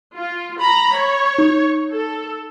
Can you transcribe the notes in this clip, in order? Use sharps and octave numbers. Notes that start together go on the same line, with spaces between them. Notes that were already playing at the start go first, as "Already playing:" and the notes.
F4
A#5 B5
C#5
D#4
A4